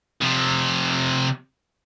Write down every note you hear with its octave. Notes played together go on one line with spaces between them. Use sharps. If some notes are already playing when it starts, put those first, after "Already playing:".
C3 F3